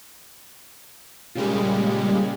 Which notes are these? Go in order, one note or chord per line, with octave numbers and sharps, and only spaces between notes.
A#2 C#3 G3 G#3